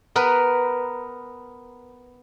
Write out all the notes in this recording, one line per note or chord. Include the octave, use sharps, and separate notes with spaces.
B3 A#4 B4